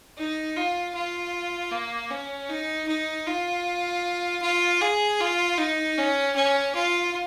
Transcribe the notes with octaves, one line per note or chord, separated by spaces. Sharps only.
D#4
F4
F4
A#3
C#4
D#4
D#4
F4
F4
G#4
F4
D#4
C#4
C#4
F4